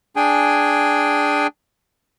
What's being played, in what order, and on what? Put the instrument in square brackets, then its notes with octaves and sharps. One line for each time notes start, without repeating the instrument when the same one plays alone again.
[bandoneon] D4 G#4 G5 G#5